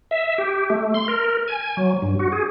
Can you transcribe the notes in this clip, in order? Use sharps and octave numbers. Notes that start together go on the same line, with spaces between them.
E5
G4
A3
C6
A#4
G#5
F#3
G2
F#4
G#4